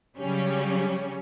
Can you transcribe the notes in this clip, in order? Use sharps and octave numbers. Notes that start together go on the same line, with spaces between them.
C#3 F#3 G3 C#4